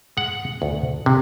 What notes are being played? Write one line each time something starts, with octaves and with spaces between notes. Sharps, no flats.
G#3 F#5
D2
C3